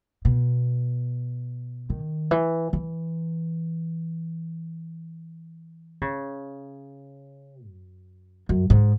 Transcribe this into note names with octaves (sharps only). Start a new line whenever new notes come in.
B2
D#3
E3
E3
C#3
F#2
F#2
G#2